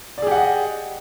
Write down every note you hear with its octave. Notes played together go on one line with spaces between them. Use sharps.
G4 G#4 D5 D#5 F#5